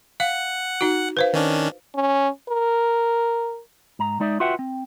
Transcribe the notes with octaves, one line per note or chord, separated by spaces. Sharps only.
F5 F#5
D#4 F#4
B4 C5 F5
D#3 C#4 D4
C#4
A#4
G#2 A#5
G#3 D#4 D5 E5
F4 F#4 B4 E5 F#5 G5
C4